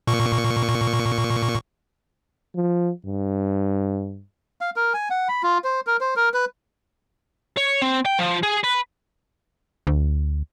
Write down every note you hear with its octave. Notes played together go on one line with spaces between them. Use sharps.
A#2 C#6
F3
G2
F5
A#4
G#5
F#5
B5
F4
C5
A#4
C5
A#4
B4
C#5
C4
G5
F3
G#4
B4
D2